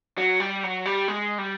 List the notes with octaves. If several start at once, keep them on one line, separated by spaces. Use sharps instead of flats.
F#3
G3
F#3
G3
G#3
G3